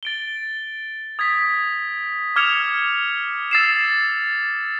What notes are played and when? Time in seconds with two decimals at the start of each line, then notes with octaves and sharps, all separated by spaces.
0.03 A6 D7 G7
1.19 D#6 G#6 B6
2.36 D6 F6 G#6 C#7 F7
3.51 E6 A6 C7 E7